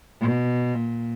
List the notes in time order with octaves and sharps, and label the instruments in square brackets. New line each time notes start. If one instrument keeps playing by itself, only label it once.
[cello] B2
A#2